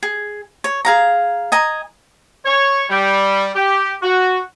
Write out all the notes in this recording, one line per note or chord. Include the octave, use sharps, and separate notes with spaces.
G#4
C#5
G#4 F5 A#5
D#5 G#5 A#5
C#5
G3
G4
F#4